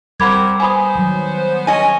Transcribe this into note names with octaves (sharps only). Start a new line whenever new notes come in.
G3 C4 A#4 F#5 B5 D6 G#6
B3 C5 G#5 B5 D#6
D#3 F#3
C#4 G#4 D#5 G#5